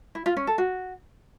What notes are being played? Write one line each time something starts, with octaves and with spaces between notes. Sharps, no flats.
E4
F4
C#4
A4
F#4